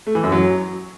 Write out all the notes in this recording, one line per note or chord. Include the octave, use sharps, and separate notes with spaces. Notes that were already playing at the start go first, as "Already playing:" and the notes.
A3
E3
F#2
F#3